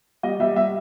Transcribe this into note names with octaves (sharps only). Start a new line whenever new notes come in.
G3 D#5
G3 E5
G3 E5